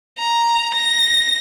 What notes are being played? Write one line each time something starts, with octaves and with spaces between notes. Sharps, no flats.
A#5
A#6